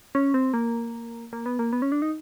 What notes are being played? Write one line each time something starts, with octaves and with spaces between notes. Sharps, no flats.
C#4
C4
A#3
A#3
B3
A#3
B3
C#4
D4
D#4